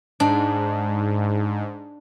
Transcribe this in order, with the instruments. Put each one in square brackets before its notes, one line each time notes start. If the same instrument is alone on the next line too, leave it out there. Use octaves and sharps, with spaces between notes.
[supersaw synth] G#2 [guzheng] D4